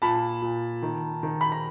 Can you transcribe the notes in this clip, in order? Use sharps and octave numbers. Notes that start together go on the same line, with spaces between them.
A#2 A5 B5
A#2
D#3
D#3
B5
A#5